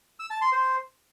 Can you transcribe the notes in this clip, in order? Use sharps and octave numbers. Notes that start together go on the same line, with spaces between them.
E6
A5
C6
C5